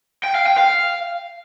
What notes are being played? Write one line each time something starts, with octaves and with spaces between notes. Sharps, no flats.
G5
F5
G5
F5